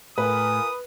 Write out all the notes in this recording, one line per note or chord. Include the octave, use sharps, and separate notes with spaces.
A2 F4 A#4 B4 G#5 D#6